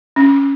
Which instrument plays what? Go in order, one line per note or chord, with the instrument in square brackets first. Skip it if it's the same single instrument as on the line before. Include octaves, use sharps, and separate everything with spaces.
[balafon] C#4